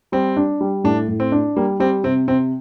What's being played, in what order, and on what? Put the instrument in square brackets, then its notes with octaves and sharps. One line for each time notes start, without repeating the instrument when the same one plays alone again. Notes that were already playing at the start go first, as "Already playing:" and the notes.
[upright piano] G3 [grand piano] C4
[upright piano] D4
G3
[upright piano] A2 [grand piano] D4
[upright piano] A2
[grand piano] C4
[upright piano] D4
[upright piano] G3 [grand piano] A#3
[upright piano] G3 [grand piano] C4
[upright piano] C3 [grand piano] C4
[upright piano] C3 [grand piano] C4